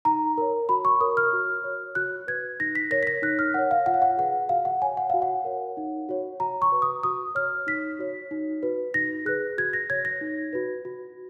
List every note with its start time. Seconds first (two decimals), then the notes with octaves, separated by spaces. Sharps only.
0.05 D#4 A#5
0.38 A#4 C#5
0.69 F#4 B5
0.85 C#6
1.01 A#4 C#5 D#6
1.17 F6
1.33 F#4
1.64 C#5
1.95 F#4 F#6
2.27 B4 G#6
2.60 D#4 A#6
2.75 B6
2.91 A#4 C#5 A#6
3.03 B6
3.07 A#6
3.22 D#4 F#6
3.39 F6
3.54 A#4 C#5 F#5
3.71 F5
3.86 F4 F#5
3.94 F5
4.02 F#5
4.18 G#4 B4 F#5
4.49 F#4 F5
4.65 F#5
4.82 C#5 G#5
4.97 F#5
5.10 F#4 F5
5.22 F#5
5.45 A#4 C#5
5.77 D#4
6.09 F#4 C#5
6.40 F#4 A#5
6.62 C#6
6.72 B4
6.82 D#6
7.03 F#4 D#6
7.35 C#5 F6
7.67 D#4 B6
7.99 F#4 C#5
8.31 D#4
8.63 F#4 B4
8.94 D#4 A#6
9.25 G#4 B4 F#6
9.58 F#4 G#6
9.73 A#6
9.90 C#5 G#6
10.05 A#6
10.21 D#4
10.53 F#4 B4
10.85 F#4